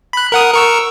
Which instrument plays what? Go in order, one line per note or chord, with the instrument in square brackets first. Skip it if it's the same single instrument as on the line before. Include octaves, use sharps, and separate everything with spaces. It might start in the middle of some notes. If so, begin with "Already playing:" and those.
[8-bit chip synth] B5 F#6
A#4 F#5 D#6
A#4 C#6 E6